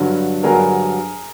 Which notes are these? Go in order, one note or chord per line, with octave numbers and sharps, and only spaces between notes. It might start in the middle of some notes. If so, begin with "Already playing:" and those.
Already playing: G2 D3 F#3
G2 D3 F#3 G#4 A#4